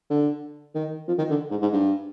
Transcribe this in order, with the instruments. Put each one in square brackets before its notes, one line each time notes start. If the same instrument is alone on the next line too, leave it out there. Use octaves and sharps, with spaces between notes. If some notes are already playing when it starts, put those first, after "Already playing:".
[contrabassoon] D3
D#3
F3
D#3
D3
G#2
G#2
G2